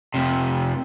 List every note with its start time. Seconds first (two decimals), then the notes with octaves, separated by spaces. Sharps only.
0.14 F2 C3